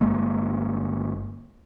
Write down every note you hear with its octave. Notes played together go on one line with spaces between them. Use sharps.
G1 G#3 A#3